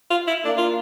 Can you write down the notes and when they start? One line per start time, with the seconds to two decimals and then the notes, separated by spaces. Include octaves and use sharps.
0.11 F4
0.27 E4
0.45 A#3 D4
0.57 F4